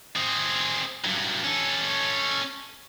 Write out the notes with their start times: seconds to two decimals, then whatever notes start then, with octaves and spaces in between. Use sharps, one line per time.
0.16 C4 G#4
1.05 G2 F#3
1.44 C#4 A4